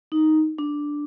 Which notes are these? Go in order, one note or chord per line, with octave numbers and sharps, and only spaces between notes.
D#4
D4